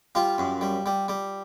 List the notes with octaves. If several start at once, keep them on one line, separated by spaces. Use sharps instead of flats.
G3 F4
F#2
G3
G3
G3